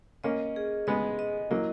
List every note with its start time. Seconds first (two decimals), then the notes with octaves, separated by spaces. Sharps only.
0.24 A#3 C#4 D#5
0.56 G#4
0.87 G#3 B3 D#5
1.19 D#5
1.51 F#3 A#3 E4